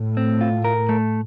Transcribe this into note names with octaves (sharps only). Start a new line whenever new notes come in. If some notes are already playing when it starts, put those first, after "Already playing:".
Already playing: A2
C4
F4
A#4
A3